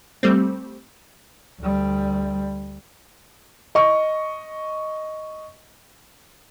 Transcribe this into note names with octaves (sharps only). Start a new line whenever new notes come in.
G3 A3 C4
D2 G3
D#5 C#6